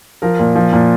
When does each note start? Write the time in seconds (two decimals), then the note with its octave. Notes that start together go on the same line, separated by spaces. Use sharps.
0.22 F3 A#4
0.39 A#2
0.56 F3
0.73 A#2